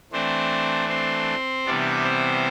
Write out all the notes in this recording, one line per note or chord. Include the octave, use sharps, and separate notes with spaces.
E3 A3 C4 D4 C5
C4 C5
C3 E3 G3 B3 D4 D5
C4 C5